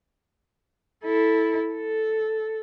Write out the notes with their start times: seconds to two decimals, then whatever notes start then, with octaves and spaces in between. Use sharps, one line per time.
1.05 E4 A4
1.74 A4